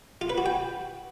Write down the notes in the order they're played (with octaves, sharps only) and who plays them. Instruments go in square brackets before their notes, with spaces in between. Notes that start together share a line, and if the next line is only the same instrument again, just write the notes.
[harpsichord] F4
B4
F#4
G5